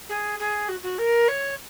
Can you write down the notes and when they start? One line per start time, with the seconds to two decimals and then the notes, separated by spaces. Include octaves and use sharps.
0.09 G#4
0.39 G#4
0.68 F#4
0.83 F#4
0.98 A#4
1.28 C#5